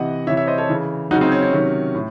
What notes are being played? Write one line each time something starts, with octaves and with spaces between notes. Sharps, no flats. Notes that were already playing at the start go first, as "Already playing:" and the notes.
Already playing: C3 E3 D#5 F#5
C3 E3 C#5 E5
C#5 E5
C5 D#5
A4 C#5
C#3 E3
C#3 F#3 D#4 F#4
C4 D#4
C#4
C#4
C3 D#3 F#3
A2